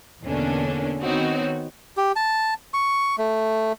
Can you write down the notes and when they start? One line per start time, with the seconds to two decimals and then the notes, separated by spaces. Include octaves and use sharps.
0.24 E2 B2 D3 A#3 C#4 D4
1.02 D#3 B3 C4 D#4 F#4 C#5
1.97 G4
2.16 A5
2.74 C#6
3.18 A3